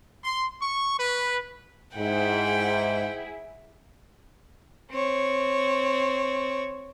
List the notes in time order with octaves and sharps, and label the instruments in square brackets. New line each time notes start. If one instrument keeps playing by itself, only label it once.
[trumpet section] C6
C#6
B4
[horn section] G#2 [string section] E4 G#4 [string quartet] F#5 G5
[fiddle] C4 C#5